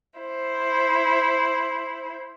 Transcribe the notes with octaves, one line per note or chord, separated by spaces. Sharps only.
E4 C5